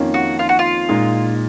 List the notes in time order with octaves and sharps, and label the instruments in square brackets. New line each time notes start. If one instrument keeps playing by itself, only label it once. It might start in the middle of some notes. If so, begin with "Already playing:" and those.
Already playing: [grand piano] F2 D#3 A#3 C#4 F4
[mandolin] F#4
F4
F#4
F4
[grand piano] A#2 G#3 D#4